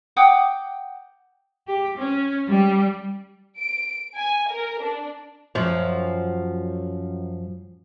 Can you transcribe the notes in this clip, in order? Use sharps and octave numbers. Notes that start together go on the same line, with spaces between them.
F#5 G5 D6 D#6
G4
C#4
G3
D7
G#5
A#4
D4
F#2 F3